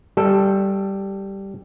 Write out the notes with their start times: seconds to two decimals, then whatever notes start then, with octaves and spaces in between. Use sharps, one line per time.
0.17 G3 A4